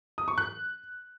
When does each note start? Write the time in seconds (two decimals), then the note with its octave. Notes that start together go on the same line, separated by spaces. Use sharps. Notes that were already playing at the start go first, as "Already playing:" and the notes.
0.18 D#6
0.28 C#6
0.38 F#6